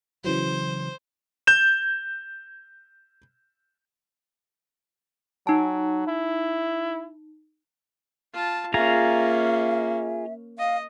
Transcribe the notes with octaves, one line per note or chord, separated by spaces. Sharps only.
C#3 E3 F#3 C5
G6 E7
F#3 D#4 A5
E4
F4 A5
A#3 C#4 F4 G#4 E5 A#5
D#5 F5